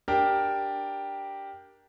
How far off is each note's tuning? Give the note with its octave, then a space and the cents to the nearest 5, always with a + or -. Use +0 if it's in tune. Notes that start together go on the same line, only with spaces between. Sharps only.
D4 +0 G4 +0 A#4 +5